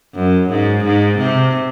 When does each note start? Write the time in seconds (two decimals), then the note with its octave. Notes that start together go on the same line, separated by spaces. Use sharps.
0.15 F#2
0.50 G#2
0.84 G#2
1.18 C3